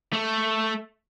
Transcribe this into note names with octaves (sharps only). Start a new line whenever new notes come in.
A3